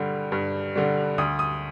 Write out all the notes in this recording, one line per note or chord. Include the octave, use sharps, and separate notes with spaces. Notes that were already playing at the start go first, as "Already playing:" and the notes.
Already playing: G2 D3 G3
G2
D3 G3
D2 D#6
D#6